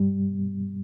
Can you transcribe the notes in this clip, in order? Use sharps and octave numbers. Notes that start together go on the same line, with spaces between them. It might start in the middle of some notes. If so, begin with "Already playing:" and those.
Already playing: G2 G3